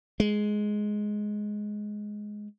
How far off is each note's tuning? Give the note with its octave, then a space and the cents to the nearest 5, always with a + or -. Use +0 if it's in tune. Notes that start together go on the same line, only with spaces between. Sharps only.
G#3 +10